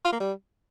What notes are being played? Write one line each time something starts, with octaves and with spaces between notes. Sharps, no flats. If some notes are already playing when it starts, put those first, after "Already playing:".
F4
A#3
G3